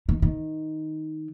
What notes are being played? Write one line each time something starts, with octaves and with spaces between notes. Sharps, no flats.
D#3
D#3